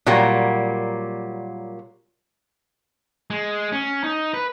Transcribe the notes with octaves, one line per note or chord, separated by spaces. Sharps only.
A#2 F#3 G3 A#3
G#3
C#4
D#4
B4